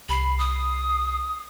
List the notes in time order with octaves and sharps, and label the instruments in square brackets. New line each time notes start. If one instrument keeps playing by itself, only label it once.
[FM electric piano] C2 C7 [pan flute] B5
[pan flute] D#6